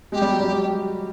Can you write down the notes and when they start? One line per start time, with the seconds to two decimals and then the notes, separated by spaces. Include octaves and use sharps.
0.12 G#3 G4
0.22 G3
0.31 F#3
0.40 G3